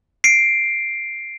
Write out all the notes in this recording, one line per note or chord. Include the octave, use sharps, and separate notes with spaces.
C7 D7